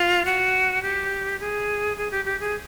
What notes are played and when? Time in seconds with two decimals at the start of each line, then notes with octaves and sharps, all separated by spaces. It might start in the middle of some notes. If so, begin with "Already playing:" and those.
Already playing: F4
0.25 F#4
0.82 G4
1.40 G#4
1.97 G#4
2.11 G4
2.25 G4
2.40 G#4